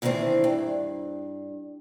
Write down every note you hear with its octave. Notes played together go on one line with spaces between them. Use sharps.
C3 D#3 E3 A3 C4 D4
G2